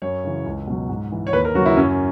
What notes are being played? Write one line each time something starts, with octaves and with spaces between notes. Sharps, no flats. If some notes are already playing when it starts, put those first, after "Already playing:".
F#2 C#5
C#3 E3
C#2
B2 F#3
G#2
E3
C#5
D#2 B4
A#4
C#3 F#3 F#4
E4
F#2 C#4